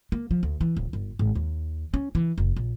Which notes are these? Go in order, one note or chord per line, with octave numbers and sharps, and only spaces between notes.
A#3
F3
D2
E3
D1
G1
G#1
D#2
C#4
E3
F1
A#1